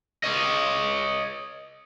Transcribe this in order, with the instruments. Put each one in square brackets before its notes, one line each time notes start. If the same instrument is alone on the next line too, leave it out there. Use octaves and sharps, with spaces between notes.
[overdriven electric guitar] C#5 D#5